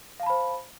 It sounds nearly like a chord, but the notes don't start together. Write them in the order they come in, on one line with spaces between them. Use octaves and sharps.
F5 A5 B5 C5